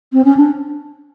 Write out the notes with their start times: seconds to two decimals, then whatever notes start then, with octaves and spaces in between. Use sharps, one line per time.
0.13 C4
0.25 C#4
0.37 D4